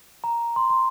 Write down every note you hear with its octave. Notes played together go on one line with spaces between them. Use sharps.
A#5
C6
C6